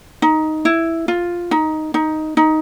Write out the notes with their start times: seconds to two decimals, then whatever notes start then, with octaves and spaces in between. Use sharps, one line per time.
0.22 D#4
0.65 E4
1.08 F4
1.51 D#4
1.94 D#4
2.37 D#4